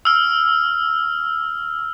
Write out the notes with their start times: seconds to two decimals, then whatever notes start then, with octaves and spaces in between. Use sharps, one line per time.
0.05 E6 F6